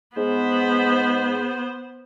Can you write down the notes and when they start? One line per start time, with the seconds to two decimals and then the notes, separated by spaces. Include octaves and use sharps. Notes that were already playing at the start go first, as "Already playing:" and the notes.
0.17 G#2 B3 C5